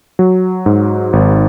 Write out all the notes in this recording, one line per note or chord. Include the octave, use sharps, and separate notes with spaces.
F#3
G#2
G#1